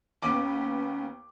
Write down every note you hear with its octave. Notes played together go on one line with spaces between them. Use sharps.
D#2 B3 C#4 D6